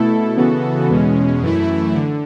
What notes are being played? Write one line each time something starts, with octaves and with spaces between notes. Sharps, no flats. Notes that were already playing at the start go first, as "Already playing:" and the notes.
Already playing: B2 A3 E4 A4
C#3 E3 B3 F#4 A4
E2 B2 G#3 C#4
F#2 E3 A3 E4
D3